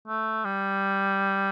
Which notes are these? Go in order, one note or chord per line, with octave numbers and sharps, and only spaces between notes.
A3
G3